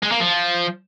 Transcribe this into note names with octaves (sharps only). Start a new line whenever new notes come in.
G#3
A#3
F3